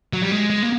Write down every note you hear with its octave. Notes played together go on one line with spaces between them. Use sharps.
F#3
G3
G#3
G#3
A#3